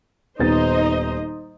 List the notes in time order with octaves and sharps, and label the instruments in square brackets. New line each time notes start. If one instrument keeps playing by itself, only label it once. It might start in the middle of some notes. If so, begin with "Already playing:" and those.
[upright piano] D#1 B3 A6 [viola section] D#4 C5 D#5